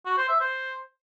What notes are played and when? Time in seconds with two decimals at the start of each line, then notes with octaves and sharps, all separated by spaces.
0.06 F#4
0.18 C5
0.29 E5
0.41 C5